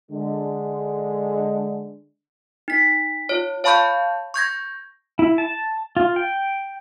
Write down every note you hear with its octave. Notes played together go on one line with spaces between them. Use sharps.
D3 G#3
D#4 B6
F4 C#5
C#5 F5 A5 B5 C#6 G6
C#6 G6 G#6 A#6
E4
A5
F4
G5